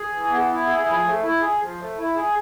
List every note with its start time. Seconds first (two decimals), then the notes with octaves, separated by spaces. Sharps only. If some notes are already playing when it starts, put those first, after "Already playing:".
Already playing: G#4
0.12 E3
0.30 B3
0.48 E4
0.67 G#4
0.87 F3
1.04 A3
1.23 E4
1.41 G#4
1.61 F3
1.80 A3
1.98 E4
2.16 G#4